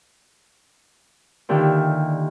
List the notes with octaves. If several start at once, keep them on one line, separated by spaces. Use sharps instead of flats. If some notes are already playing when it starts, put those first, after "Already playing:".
A#2 D3 D#3 G4 E5